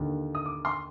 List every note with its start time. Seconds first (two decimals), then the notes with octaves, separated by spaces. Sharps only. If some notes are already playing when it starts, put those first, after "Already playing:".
Already playing: D#2 D3
0.35 D#6
0.46 D6
0.65 C6